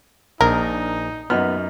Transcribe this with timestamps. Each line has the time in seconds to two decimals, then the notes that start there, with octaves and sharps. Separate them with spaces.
0.41 A#1 D4 D#4 A#4
1.30 F#2 B3 D#4 F6